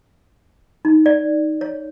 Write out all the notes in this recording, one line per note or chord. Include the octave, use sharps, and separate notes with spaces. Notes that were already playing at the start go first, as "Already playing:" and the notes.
D#4
D5
C#5